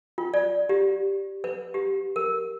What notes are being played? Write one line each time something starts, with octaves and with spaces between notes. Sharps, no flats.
F4
D5
G4
B4
G4
A#4